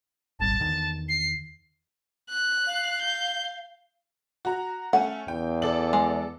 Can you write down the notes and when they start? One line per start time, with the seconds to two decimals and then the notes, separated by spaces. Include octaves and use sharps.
0.40 D#1 G#1 G3 A5
0.60 E2 D3 D#3
1.09 C7
2.30 F#6
2.67 F5
3.02 G6
4.45 F#4 A#5
4.93 A3 C#4 F#5
5.28 E2 G5
5.62 A4 D5 F#7
5.93 G#3